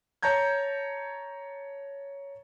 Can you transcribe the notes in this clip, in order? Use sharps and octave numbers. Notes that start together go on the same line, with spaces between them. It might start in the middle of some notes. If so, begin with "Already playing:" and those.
C#5 A5 A#5 G6 G#6